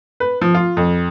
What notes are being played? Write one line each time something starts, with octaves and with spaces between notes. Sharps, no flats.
B4
F3
F4
F2